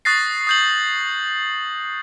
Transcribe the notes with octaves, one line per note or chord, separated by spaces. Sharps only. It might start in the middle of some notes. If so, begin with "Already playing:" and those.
C#6 D#6 F#6 A6 A#6 C7
D#6 G6 F#7